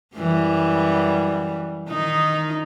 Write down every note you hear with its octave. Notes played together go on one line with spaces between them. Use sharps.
F#2 E3 G3
D#3 D#4